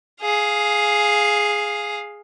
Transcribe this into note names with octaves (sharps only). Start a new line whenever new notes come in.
G#4 F5